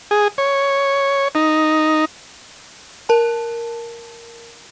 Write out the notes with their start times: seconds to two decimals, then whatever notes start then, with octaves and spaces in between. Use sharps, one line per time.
0.11 G#4
0.38 C#5
1.35 D#4
3.09 A#4 A5